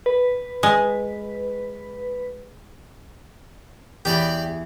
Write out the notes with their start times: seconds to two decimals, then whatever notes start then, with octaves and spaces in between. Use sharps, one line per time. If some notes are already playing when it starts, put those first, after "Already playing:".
0.06 B4
0.63 G#3
4.05 E2 G4 D5 G5 B5